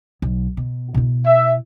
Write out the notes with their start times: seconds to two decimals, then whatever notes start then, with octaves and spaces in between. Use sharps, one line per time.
0.22 B1
0.57 B2
0.94 B2 E4
1.25 E5